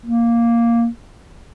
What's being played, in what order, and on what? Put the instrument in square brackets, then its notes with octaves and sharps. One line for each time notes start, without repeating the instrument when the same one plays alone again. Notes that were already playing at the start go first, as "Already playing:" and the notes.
[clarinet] A#3